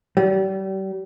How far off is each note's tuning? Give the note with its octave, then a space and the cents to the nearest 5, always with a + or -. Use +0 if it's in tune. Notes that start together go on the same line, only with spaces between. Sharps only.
G3 -35